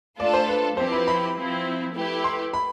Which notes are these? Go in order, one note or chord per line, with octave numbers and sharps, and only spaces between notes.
A3 D4 F4 A4 D5
C5
B4
F3 C4 E4 G4 B4 C5
B5
B5
F3 C4 E4
A3 E4 G4 B4
C6
B5